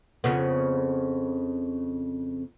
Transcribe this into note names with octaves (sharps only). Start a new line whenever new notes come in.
F2 C#3 B3